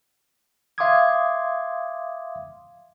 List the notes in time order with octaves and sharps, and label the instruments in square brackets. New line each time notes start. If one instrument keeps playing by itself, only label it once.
[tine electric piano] E5 F5 C6 D6 D#6 G#6